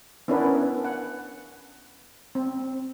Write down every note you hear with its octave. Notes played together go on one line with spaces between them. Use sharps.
B3 C#4 D4 E4 A#4 B4
F#5
C4